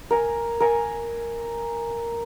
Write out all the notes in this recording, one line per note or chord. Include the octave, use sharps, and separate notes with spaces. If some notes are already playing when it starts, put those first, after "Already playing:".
A#4 G#5
A#4 G#5